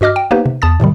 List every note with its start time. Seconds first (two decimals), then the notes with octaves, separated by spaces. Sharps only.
0.01 G2 F#4 D#5 D6 F6
0.16 G5
0.31 A#3 B3 D#4 G4 B4 C5
0.46 C3
0.62 E2 A5 D#6 A6
0.80 A2 C3 D#3 G3